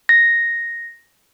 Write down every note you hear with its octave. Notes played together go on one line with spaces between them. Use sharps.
A#6